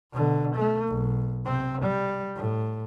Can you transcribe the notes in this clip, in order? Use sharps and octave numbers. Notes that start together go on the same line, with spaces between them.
B2 D3
A3
B1
C3 C4
G3
A2